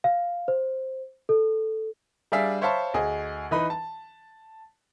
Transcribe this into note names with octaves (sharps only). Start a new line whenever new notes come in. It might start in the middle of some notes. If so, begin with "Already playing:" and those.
F5
C5
A4
G3 D4 G#4 D5 E5 F5
C5 C#5 E5 F5 A5 B5
D2 G#4 D#5
E3 D#4 B4 B5
A5